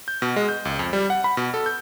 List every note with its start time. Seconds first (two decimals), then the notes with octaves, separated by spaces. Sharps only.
0.08 G6
0.22 B2
0.36 G#3
0.49 G6
0.65 C#2
0.79 F2
0.93 G3
1.10 F#5
1.24 B5
1.37 B2
1.54 A4
1.66 G6